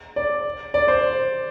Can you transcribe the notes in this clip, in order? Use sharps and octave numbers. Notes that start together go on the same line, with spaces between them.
D5
D5
C5